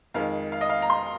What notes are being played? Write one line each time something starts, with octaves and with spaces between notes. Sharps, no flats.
F2 D#3 G#3 F5
F5
D#5
F5
A#5
C6